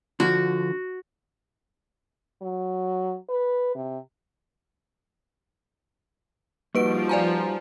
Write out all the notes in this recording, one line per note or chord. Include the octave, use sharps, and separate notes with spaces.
D3 F3 F#4
F#3
B4
C3
F3 G3 A#3 D#4 F#4 B4 D7
D5 G#5 A#5